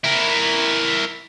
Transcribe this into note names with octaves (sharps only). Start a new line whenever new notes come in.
E4 A#4